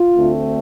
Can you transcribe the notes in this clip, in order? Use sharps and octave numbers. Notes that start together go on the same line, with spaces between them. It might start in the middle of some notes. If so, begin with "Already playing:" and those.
Already playing: F4
D2 D3 A3 C4